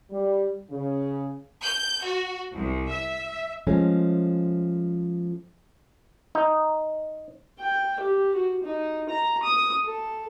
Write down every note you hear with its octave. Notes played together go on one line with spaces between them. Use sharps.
G3
C#3
G6
F#4
C2
E5
F3 G#3 A3 C#4
D#4
G5
G4
F#4
D#4
A#5
D#6
A4